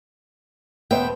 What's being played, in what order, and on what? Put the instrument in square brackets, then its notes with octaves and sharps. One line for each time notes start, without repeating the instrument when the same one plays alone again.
[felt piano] E1 C5 E5 [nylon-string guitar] B3 [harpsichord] G5